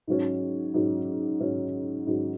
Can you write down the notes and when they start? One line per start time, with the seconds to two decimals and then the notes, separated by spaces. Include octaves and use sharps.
0.07 G#2 F#3 C#4
0.74 G#2 F#3 C#4
1.41 G#2 F#3 C#4
2.07 G#2 F#3 C#4